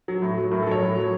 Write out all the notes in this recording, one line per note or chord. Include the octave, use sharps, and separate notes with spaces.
F#3
A2
F#3
A2 A#4
A4
F#3 C#5
A2
F#3